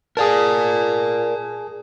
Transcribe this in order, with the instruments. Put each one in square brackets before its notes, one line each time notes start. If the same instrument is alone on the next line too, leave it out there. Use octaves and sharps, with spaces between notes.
[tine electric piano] G#4 A5 [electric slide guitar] A#4 D5